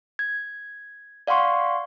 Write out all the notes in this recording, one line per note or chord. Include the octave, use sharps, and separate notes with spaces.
G#6
D5 F5 F#5 C6 C#6